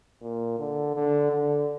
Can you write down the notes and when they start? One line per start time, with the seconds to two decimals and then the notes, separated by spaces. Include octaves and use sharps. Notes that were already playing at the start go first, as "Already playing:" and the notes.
0.22 A#2
0.59 D3
0.95 D3
1.32 D3